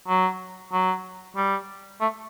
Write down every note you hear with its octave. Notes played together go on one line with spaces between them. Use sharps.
F#3
F#3
G3
A3